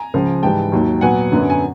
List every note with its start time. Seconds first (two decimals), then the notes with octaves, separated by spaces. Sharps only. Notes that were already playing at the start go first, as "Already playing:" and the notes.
Already playing: G#5 A#5
0.14 C#2 C#3 F3
0.43 G#2 E3 G3 G5 A5
0.72 D#2 D#3 F#3 A#3
1.01 A#2 F#3 B3 F#5 G#5
1.32 F#2 D3 F#3 B3
1.50 G#5